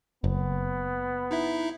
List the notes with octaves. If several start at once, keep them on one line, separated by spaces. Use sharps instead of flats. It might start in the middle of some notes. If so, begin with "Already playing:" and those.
F#1 B3
D#4 E4 E5